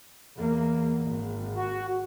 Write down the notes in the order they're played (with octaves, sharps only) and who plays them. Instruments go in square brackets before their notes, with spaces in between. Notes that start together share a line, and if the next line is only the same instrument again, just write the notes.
[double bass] E2 A#3
G#1
[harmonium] F#4